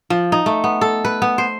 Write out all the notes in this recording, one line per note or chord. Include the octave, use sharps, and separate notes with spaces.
F3
D#4
A3
B3
A4
B4
B3
C5